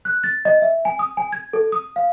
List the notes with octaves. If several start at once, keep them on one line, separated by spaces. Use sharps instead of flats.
F#6
A6
D#5
E5
G#5
D#6
G#5
G#6
A4
D#6
F5